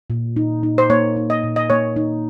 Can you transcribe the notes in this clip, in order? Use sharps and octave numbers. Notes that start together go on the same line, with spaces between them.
A#2
D#4
D#4
C5
A#3 C#5
D#4
D#5
A#2
D#5
A#3 C#5
D#4